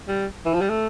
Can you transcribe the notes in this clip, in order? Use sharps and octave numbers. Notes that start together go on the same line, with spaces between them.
G3
E3
F3
G3
A3